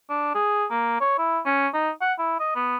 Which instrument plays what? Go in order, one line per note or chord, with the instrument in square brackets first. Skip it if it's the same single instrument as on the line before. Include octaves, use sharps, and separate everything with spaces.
[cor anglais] D4
G#4
A#3
C#5
E4
C#4
D#4
F#5
E4
D#5
B3